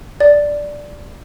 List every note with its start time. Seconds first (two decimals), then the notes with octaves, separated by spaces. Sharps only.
0.20 D5